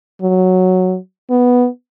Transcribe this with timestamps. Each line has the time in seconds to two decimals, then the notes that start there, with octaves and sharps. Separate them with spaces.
0.22 F#3
1.30 B3